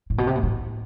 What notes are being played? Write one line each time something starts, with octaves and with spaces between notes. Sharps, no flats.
A2
B2
C3
B2
A2